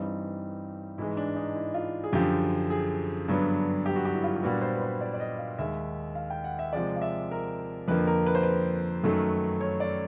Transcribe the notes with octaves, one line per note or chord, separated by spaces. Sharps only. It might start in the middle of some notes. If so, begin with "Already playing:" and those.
Already playing: G2 E3 G3 C4 D#4
G#2 E3 G#3 E4
D4
D#4
E4
F4
G#4
F#2 D3 F3 G4
G#4
G2 D3 F#3 B3 D4
G4
F#4
G4
E4
F4
G4
A#2 G3 B3 D4 F#4
C5
B4
C5
D5
D5
D#5
F5
D#2 D#3 G#3 E5
F5
G5
F#5
E5
C3 F3 G#3 D5
F5
E5
A#4
F2 D3 F3 A#3 B4
A#4
B4
C5
B4
F#2 D#3 F#3 A3
C#5
D5